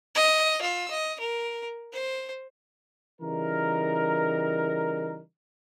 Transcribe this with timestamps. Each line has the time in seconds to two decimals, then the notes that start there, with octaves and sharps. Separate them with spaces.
0.15 D#5
0.61 F4 E6
0.90 D#5
1.20 A#4
1.93 C5
3.21 C#3 E3 G3 D#4 A#4